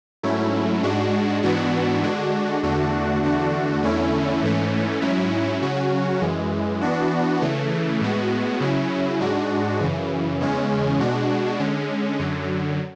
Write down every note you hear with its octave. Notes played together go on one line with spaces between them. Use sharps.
G#2 F#3 A3 C#4 E4
G#2 G#3 D4 F#4
G#2 E3 B3 D4 F#4
D3 G#3 D4 F#4
E2 D3 A3 D4 F#4
E2 D3 A3 D4 F#4
E2 D3 A3 C#4 E4
G#2 E3 A3 C#4
G#2 F#3 C#4 E4
C#3 F#3 C#4 F#4
F#2 E3 G#3
E3 B3 D4 F#4
C#3 E3 A3
A2 G#3 B3 F#4
C#3 F#3 C#4 E4
G#2 G#3 D4 F#4
F#2 C#3 E3
E2 C#3 G#3 C#4
B2 G#3 D4 F#4
D3 G#3 C#4
F#2 D3 F#3